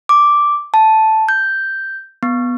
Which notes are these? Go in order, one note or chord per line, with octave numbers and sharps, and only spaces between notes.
D6
A5
G6
B3